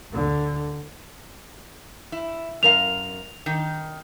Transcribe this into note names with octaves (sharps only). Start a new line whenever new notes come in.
D2 D3
E4
F#2 A#4 F5 F7
D#3 D#4